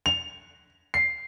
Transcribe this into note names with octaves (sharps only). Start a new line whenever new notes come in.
F7
C7